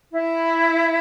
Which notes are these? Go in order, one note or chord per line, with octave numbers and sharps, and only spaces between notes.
E4